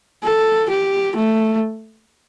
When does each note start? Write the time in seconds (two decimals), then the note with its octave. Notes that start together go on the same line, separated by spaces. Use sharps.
0.24 A4
0.70 G4
1.16 A3